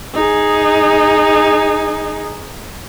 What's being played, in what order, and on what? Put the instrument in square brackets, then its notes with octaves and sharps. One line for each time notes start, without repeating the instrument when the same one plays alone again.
[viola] D#4 G#4